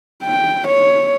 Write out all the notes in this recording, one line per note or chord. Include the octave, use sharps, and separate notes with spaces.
G5
C#5